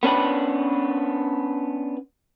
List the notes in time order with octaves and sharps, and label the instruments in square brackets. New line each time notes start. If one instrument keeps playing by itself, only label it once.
[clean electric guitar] B3 C#4 D4 B4